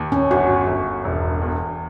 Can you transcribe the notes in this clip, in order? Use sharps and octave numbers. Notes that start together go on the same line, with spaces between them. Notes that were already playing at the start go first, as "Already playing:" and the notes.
Already playing: D#2
C#4
G1 F#4
G1
E1
E2